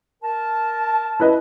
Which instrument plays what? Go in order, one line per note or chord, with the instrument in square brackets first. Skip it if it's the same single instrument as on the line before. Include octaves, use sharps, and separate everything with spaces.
[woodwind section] A#4 A5
[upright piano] E4 B4 D#5